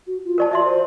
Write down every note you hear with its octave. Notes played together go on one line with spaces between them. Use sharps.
F#4
F4
A#4 D5 A5
F#4 D5 E5 C6
C5